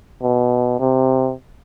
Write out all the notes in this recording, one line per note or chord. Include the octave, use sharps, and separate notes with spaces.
B2
C3